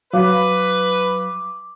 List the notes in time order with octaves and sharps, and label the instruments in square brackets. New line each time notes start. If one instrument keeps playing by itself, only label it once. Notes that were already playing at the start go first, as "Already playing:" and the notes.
[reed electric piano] F#3 [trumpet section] B4 [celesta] F5 [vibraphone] D6